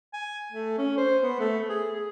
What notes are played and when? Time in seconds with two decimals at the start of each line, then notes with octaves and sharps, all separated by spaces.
0.13 G#5
0.52 A3
0.78 C#4
0.98 C5
1.23 B3
1.39 A3
1.69 G#4
1.91 G#4